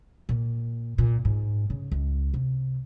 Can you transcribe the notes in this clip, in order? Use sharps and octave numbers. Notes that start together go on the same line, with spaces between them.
A#2
A#2
G#2
C#3
C#2
C3